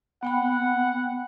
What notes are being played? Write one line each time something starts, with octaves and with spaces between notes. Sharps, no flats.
B3 F#5 G5 B5